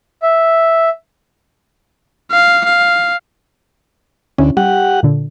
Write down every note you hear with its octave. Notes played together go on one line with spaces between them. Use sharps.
E5
F5
F5
D2 C#4 E4
G3 G4 F#5
A#2 D3